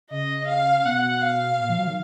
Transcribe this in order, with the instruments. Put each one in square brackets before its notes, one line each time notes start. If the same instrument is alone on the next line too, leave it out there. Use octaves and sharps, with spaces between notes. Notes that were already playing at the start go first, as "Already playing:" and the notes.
[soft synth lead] C#3 [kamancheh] D#5
[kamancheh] F5
[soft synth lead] B2 [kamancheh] F#5
[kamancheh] F5
[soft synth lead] A#2
F3
F#3
D#3